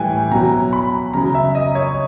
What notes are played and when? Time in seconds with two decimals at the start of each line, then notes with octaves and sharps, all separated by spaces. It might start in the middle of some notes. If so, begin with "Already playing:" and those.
Already playing: A2 E3 G3 G5 G#5
0.31 B2 F#3 A#5
0.73 B5
1.13 C#3 F#3 A#5
1.35 E5
1.55 D#5
1.75 C#5